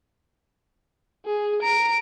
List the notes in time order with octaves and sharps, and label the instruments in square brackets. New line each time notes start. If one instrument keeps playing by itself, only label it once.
[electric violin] G#4
[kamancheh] A#5 [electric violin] D7